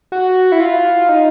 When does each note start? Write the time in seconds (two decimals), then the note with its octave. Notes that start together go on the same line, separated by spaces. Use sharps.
0.12 F#4
0.52 E4
0.60 F4
1.09 D#4